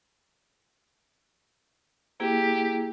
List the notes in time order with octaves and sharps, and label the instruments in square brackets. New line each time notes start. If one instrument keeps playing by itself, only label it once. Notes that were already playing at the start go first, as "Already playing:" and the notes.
[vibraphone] A#3 E4 G#4 [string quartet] G4